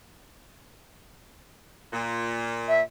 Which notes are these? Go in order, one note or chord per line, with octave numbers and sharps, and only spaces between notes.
A#2
E5